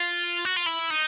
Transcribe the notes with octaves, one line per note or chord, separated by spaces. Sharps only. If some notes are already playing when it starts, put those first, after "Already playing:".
Already playing: F4
F#4
F4
E4
D#4